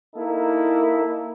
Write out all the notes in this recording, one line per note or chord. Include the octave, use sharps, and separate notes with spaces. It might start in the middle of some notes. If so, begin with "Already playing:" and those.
A#3 D#4 E4 A4 A#4